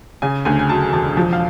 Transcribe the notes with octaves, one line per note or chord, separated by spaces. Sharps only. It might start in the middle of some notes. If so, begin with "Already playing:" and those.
C#3 G#5
D2 G#5
G#5
F#3 A5
E1 A5
F3
F5